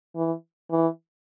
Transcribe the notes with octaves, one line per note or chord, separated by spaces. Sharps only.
E3
E3